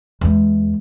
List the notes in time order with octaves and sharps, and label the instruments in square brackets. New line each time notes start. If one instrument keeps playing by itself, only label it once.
[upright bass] E2 G#3